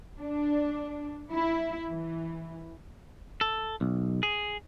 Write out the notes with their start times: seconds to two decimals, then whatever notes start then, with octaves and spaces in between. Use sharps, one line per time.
0.18 D4
1.31 E4
1.89 E3
3.41 A4
3.81 B1
4.23 G#4